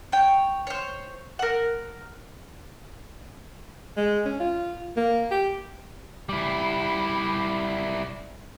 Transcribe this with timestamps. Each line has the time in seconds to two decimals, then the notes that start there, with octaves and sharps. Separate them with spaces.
0.12 C#5 G5
0.67 C5 C#5
1.39 A#4 F#5
3.97 G#3
4.25 C#4
4.40 F4
4.96 A#3
5.31 G4
6.29 G3 E4